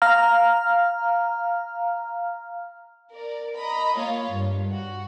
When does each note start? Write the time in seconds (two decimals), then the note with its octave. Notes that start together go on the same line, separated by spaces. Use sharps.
0.02 F5 A#5 F6
3.10 A#4 D5
3.56 D#5 A#5 B5
3.95 A#3 F4 C#5 F5
4.31 G2
4.70 F#4